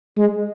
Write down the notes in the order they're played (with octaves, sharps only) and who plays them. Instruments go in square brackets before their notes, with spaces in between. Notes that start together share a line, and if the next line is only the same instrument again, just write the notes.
[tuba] G#3